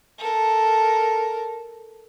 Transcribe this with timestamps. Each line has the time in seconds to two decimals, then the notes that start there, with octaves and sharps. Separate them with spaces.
0.19 A4 A#4